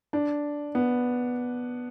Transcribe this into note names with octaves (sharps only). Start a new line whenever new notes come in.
D4
B3